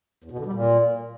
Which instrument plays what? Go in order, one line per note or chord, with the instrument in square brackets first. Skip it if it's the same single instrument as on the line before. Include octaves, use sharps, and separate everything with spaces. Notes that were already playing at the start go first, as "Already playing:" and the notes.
[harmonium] E2
B2
D3
G3
A#2